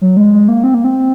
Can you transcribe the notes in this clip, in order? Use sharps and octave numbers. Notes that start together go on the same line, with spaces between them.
F#3
G#3
G#3
A#3
C4
A#3
C4